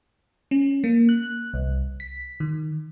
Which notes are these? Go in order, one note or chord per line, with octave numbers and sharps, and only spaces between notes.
C#4
A#3
F#6
C2
B6
D#3